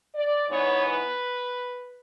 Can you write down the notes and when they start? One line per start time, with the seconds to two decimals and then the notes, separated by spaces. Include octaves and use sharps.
0.14 D5
0.48 G#2 E3 B3 C#5
0.83 B4